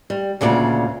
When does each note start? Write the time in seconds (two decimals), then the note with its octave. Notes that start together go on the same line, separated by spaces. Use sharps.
0.10 G3
0.41 D2 A#2 C#3 D5